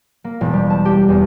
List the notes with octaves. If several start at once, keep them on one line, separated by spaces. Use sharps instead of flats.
A#3
E1
G3
A5
G4
E2